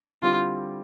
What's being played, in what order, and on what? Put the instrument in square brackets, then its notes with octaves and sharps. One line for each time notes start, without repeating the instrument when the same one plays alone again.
[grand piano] D3 G3 C4 E4 G4 [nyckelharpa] F4